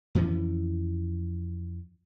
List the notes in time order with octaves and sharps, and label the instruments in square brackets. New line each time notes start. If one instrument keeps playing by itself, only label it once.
[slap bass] F2 E3 F3 C#4